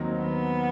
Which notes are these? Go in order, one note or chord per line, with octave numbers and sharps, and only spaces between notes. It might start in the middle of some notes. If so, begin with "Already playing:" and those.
Already playing: D#2 D#3 F#3 C4 D#4
B3